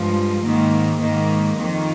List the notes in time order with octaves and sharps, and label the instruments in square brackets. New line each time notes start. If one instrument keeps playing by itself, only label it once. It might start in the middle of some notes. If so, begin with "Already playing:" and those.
Already playing: [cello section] G2 F3 G#3
G#2 D#3 A#3
G#2 D#3 A#3
F2 D#3 A#3